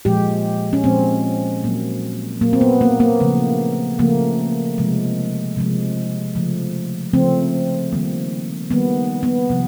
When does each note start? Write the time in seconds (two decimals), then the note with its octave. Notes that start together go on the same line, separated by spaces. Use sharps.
0.05 A#2 F3 G#3 G4
0.73 C#4
0.84 A#2 F3 G#3 C4
1.63 A#2 F#3 A#3
2.41 A#2 F#3 A#3
2.53 C4
2.61 B3
2.81 A#3
3.00 A#3
3.20 C#3 F3 A3
3.99 C#3 F3 A3 A#3
4.78 C3 F3 G#3
5.56 C3 F3 G#3
6.35 C#3 F3 A3
7.14 C#3 F3 A3 C4
7.93 D#3 G3 A#3
8.70 D#3 G3 A#3 B3
9.23 B3
9.50 C3 F3